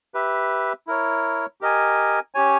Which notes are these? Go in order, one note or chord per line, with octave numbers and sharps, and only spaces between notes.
G4 B4 E5
E4 A#4 C#5
G4 A#4 D#5 G#5
C#4 G4 C#5 G#5